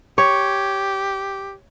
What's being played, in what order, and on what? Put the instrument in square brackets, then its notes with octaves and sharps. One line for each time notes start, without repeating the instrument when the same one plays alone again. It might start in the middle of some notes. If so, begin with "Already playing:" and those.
[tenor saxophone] G4 [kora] C#5